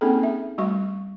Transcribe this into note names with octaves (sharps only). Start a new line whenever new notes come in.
A#3 C4 C#4 D#4 G#4 A4
E5
G3 A3 F#4 C#6